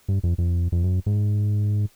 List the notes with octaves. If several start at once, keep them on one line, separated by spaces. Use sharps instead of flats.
G2
F2
F2
F2
F#2
G#2